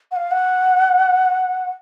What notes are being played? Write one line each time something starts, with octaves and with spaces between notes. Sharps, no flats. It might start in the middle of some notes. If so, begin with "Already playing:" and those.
F#5
F5
F#5